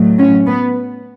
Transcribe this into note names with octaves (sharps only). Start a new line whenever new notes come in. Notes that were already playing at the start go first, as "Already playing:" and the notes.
Already playing: A2 F#3 A3
C#4
B3